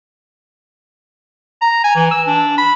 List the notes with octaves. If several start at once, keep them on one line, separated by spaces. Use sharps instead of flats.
A#5
G#5
E3
E6
D4
B5